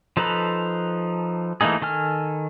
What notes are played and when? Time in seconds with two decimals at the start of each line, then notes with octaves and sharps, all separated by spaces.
0.17 F3 D#4 A4 B4 A#5
1.61 E3 A3 A#3 D#4 G#4
1.82 D#3 A4 G#5 F6